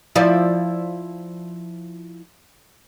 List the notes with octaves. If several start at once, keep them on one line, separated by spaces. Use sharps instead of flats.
F3 E4 D5